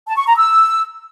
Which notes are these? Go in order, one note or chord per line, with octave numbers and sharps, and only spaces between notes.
A5
C#6
A#5
E6